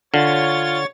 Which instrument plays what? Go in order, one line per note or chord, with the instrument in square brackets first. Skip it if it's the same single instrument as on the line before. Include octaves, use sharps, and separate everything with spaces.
[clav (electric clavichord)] D3 [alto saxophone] F4 [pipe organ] C#5 A6